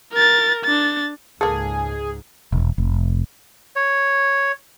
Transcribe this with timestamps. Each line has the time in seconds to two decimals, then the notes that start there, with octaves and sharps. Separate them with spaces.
0.13 A#4 A6
0.64 D4 A6
1.41 C#2 G#2 A#3 G#4 A4
2.52 E1
2.78 F1
3.76 C#5